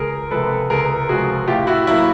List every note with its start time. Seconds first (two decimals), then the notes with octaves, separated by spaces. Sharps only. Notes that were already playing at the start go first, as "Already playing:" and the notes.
Already playing: C#2 G#4 A#4
0.31 C3 F3 G#3 A4 B4
0.70 C#2 G#4 A#4
1.09 C3 F3 G#3 F#4 G#4
1.48 A2 F4 G4
1.67 E4 F#4
1.87 F#3 E4
1.91 A#3